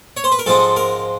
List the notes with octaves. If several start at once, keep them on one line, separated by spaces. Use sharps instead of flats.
C#5
C5
B4
A#4
G#2 F3 G#3 C4 A4
A#4